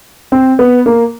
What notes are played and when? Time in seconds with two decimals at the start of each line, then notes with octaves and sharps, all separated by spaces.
0.32 C4
0.59 B3
0.86 A#3